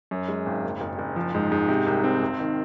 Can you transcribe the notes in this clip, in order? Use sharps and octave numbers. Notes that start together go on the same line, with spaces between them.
F#2
G#3
G#1
F#1
F#1
F#1
F3
G#2
G#2
C3
C2
C4
G#1
D#3